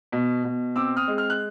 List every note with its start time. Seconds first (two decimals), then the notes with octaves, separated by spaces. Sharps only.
0.12 B2
0.44 B2
0.76 C4 D6 E6
0.97 D#6 F6
1.08 G#3
1.18 F6
1.30 F#6